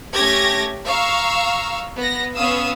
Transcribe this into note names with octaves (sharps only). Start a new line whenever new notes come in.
A3 C#4 G4 G#6 A#6
F5 A#5 C#6 E6
B3 A#6
B3 C#4 F5 D#6 E6